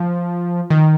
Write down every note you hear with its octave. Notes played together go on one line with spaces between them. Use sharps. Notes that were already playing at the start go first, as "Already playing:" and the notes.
Already playing: F3
D#3